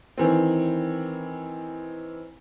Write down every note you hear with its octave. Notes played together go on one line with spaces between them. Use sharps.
D#3 E3 C4